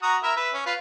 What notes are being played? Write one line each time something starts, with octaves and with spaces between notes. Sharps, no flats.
F#4 A#5 D#6
E4 A#4 E5
B4 E5
C#4
F4 B4